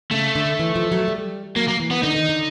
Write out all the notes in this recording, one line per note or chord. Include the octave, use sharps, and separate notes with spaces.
C#3 A3
D3
E3
F3
F#3
G3
F#3 A#3
A#3
E3
B3
D3 D#4
D#3
D3